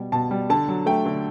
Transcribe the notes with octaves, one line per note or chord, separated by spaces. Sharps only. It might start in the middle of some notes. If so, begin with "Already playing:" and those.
Already playing: B2 G3
B2 A5
G3
D3 A5
F#3
A3 G5
D3